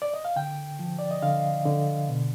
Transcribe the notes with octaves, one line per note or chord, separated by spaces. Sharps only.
D5
D#5
F5
D3 G5
F3
D5
D#5
D3 F5
D3
B2